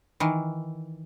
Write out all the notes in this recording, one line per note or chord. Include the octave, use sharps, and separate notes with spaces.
D#3 E3